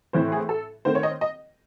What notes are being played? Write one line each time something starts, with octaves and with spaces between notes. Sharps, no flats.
A2 E3 C4 E4 C5
G#4
A4
D#3 A3 C4 C5
C#5
D#5
D#5